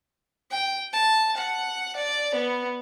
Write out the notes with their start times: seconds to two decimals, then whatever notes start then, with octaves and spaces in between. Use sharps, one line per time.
0.51 G5
0.93 A5
1.37 F#5
1.96 D5
2.35 B3